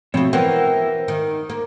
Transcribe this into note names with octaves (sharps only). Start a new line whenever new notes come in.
B2 F3 A3 C4 C#5
E3 B3 A#4 C5 G5
D#3
A#3